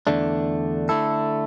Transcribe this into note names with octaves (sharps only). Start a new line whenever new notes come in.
E2 D3 A3 D4
D3 A3 E4 A4